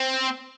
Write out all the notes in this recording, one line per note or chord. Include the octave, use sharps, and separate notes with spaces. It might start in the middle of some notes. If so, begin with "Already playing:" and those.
Already playing: C4